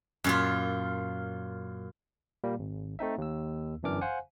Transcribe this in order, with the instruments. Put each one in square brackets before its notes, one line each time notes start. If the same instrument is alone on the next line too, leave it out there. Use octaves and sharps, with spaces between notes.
[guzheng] F#2 A#2 F4
[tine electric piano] A#2 G3 A#3
G#1
A3 C4 D#4 E5
D#2 E6
G1 F#2 E3 D4 D6 F6
C5 F5 F#5 G#5